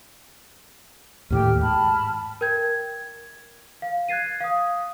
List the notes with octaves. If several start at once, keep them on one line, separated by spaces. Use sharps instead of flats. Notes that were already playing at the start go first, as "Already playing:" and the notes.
D#2 A2 D#3 G4 G5 F6
G#2 A5 B5 F6
A#4 G5 G6 G#6
G#6
F5
F#6 G#6 A6 C7 D#7
F5 D#6